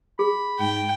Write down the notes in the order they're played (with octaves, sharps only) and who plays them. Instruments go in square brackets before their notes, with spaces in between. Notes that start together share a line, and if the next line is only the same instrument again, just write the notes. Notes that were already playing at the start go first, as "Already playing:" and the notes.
[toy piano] G#4 [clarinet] B5
[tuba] G#2 [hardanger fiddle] G5